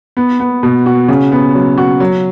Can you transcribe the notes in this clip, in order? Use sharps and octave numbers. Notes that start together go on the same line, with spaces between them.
B3
B3
B2
F#4
C#3
B3
F#3
F#4
F#3